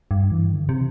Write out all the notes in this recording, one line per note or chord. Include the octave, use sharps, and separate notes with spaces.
G2
E3
D3
C3